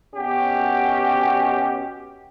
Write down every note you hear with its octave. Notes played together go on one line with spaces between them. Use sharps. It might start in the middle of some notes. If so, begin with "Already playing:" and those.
B2 C#4 F#4 G4